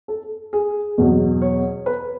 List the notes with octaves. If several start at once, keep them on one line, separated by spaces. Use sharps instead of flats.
A4
G#4
E2 B2 F#3
C#5
B4